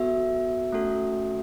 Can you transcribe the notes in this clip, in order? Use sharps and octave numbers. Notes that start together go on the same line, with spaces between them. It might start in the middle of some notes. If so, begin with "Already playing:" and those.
Already playing: B3 F#4 A4 E5
A3 C#4 F#4 A4